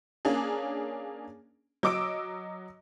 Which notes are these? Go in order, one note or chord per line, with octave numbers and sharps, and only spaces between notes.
A#3 C#4 D4 G#4
F#3 D#5 D6 E6 D7